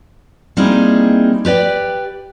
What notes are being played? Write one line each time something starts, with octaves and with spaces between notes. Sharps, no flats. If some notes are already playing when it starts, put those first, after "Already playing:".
G3 A#3 C4 D#4 E4 G#4
G4 B4 D5 G5